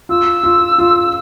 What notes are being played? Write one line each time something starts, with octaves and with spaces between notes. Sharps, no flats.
F4 E6
F4
F4